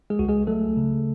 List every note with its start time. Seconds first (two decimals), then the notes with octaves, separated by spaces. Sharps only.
0.10 G#3 G#4
0.19 C#2 F#4
0.29 G#3 G#4
0.47 F#3 A3 A4
0.77 C#3